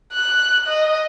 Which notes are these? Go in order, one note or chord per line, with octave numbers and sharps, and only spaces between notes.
F#6
D#5